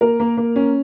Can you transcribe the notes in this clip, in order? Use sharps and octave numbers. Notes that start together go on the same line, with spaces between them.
A#3 A#4
A#3
A#3
C#4